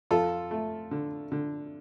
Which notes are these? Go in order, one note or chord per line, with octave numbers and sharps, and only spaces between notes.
F2 F4 A4
A3
D3
D3